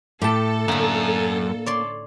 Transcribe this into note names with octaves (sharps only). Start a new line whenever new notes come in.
A2 G4 A4 A5
F#2 A2 D3 A#3
C#5 D5 C6